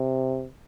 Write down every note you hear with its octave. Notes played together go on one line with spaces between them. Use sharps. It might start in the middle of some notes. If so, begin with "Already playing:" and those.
Already playing: C3